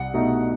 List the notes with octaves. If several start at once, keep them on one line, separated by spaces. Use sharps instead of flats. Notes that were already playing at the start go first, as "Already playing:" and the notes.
Already playing: C2 F#5
B2 A3 D#4